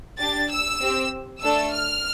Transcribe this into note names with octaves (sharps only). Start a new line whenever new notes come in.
D4 G4 A6
E6
C4 G4
A3 D4 A4 E6
F6